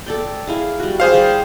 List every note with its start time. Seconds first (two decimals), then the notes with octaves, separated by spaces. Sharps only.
0.06 A4 D5 G5
0.47 E4 G#4 F5
0.79 G3 F#4
1.00 G#4 C5 F5
1.14 G3 G4